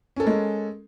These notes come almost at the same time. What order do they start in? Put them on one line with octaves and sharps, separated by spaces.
C#4 A4 A#4 G#3